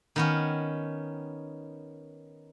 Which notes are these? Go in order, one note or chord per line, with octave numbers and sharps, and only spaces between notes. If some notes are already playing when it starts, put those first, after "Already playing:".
D#3 B3 C#4